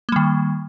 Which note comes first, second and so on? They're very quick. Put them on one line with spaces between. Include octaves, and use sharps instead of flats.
A#3 G3 D#3